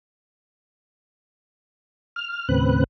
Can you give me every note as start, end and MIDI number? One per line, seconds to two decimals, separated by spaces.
2.16 2.48 89
2.49 2.84 39
2.49 2.84 45
2.49 2.84 49
2.49 2.84 60
2.49 2.84 71
2.49 2.84 90